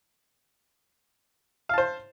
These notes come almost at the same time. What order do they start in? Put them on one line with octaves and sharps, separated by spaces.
F5 A5 C5